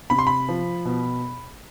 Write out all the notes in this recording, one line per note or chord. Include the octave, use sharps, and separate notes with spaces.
C3 B5
C6
B5
F3
B2